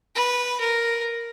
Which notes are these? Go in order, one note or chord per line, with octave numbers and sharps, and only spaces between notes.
B4
A#4